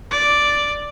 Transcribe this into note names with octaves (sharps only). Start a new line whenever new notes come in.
D5